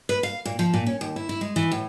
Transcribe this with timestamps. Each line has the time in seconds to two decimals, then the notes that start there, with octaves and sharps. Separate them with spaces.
0.09 B4
0.23 F5
0.45 A#2
0.59 F3
0.74 A#2
0.86 C#4
1.01 D#2
1.16 E4
1.29 E4
1.41 G#3
1.56 E3
1.72 A2